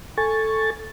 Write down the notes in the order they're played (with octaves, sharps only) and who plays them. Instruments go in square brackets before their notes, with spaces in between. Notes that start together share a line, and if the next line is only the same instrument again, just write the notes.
[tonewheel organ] A4 G#5 C#6 A6